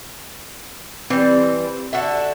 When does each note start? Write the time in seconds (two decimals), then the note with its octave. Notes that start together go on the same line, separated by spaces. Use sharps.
1.10 E3 G3 C4
1.93 D3 F#4 A4 E5